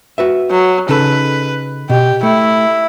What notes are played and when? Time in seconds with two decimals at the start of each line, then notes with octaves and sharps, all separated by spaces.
0.18 F#4 B4 E5
0.50 F#3
0.89 C#3 D#4 A4 B4
1.90 B2 G4
2.23 A3 E4